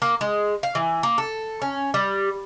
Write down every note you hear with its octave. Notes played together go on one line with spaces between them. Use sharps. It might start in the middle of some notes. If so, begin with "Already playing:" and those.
A#3
G#3
F5
E3
A#3
A4
C#4
G3